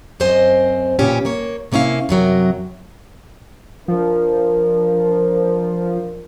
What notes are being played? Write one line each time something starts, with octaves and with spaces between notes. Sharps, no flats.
F#2 C4 C5 D#5 G#5
E2 A#2 C#3 C#4 G4
A#3 C#5
C3 A#3 C#4 E4 F5
F#2 C3 F#3 A#4
F3 D4 A#4